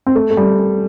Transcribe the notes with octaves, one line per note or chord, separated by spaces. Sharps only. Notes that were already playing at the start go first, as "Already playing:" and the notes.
C4
A3
A3
G3